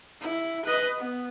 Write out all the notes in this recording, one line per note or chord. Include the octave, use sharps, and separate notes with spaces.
E4
B4 D#5
B3